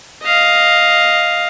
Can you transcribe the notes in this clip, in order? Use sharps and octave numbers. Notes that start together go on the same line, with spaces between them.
D#5 F5